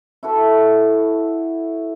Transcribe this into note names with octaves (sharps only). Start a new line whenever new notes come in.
E4 F#4 A4 B4